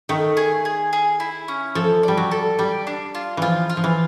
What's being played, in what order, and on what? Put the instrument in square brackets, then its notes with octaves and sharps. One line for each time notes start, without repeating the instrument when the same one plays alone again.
[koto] D#3 [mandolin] A3
[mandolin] G#4
G#4
G#4
E4
C#4
[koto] F3 [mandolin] A4
[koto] G3 [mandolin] D5
[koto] F#3
[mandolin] A4
[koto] G3 [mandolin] D5
[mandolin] D4
F4
[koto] E3 F3 [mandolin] F4
[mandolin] F4
[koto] F3
E3